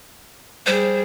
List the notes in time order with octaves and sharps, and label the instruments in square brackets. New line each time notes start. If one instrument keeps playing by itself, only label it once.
[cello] G3 G#4 [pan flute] C5